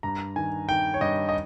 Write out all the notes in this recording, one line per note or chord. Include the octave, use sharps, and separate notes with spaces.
G2 A#5
D#3 G#5
D#3 G5
C#5
G2 D#5
D#5